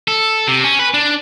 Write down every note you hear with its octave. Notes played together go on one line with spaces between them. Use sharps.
A4
C3
C#4
B4
D4